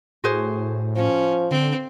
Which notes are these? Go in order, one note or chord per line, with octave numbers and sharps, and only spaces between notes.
A2 F#4 G#4 C5
F3 C#4
D3 C4